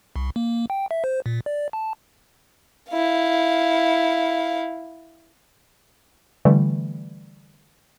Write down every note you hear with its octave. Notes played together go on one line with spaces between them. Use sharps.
C2
A#3
G5
E5
C5
A#2
D5
A5
E4 F5
D3 E3 G3 A3